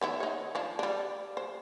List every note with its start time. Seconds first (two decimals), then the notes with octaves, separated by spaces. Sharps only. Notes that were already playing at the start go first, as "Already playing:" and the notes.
0.01 D#3 B3 E4
0.20 D#4 C#5
0.55 F3 D4
0.79 G3 D4
1.37 C5